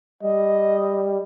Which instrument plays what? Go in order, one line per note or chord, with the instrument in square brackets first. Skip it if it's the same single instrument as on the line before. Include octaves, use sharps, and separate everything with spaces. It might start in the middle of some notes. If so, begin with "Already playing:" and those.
[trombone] G3 [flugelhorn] D#5